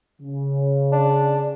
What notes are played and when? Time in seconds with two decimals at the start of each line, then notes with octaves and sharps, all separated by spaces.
0.21 C#3
0.92 D4